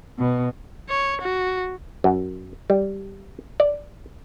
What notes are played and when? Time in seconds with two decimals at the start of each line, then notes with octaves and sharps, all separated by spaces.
0.18 B2
0.89 C#5
1.21 F#4
2.04 F#2
2.70 G3
3.60 D5